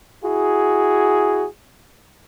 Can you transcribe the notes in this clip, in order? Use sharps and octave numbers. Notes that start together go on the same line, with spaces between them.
E4 F#4 G#4